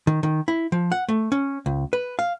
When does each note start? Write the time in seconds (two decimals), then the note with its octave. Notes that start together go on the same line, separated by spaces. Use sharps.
0.07 D#3
0.23 D#3
0.48 E4
0.72 F3
0.92 F#5
1.09 A3
1.32 C#4
1.66 C#2
1.93 B4
2.19 F5